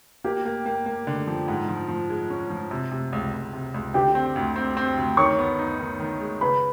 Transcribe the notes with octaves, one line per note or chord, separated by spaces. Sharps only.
A#3 G4 G5
A#3
A#3
A#3
D3
F3
G#2 F#5
F3
F3
G#3
C#4
F3
C3
C3
C#2
C#2
C3
C#2
D3 G4 G5
C4
D2
C4
C4
D2
D#3 C#5 C#6
B3
D#4
D#3
D#3
G#3
C#3 B4 B5